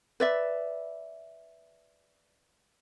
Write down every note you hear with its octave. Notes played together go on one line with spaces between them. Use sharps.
B4 D5 E5